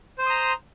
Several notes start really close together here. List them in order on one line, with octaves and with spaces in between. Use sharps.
C5 C6 D#6 A#5